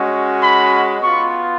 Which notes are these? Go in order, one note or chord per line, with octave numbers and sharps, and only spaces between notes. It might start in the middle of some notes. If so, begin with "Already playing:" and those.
Already playing: G#3 C#4 F#4
B5
B3 F4 C#6